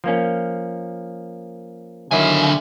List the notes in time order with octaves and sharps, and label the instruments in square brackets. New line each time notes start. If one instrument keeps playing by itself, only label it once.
[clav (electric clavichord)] F3 A#3 C#4
[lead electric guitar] D3 G#5 [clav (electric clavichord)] D#3 F#3 E4 [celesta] E5 D6 F6